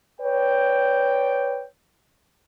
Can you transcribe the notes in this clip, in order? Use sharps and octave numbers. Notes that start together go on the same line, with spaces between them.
B4 C#5 D5 G5